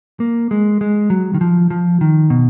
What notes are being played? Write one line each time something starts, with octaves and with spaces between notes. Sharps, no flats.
A#3
G#3
G#3
F#3
D#3
F3
F3
D#3
B2